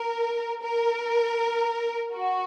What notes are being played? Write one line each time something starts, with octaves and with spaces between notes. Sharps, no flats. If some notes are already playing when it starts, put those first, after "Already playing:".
Already playing: A#4
A#4
F#4